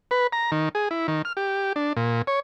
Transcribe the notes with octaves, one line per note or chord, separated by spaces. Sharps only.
B4
A#5
D#3
G#4
E4
D#3
F6
G4
D4
A#2
C#5